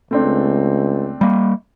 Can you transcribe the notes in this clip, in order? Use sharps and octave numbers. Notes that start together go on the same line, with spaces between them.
C#2 A3 C4 D4
G3 A#3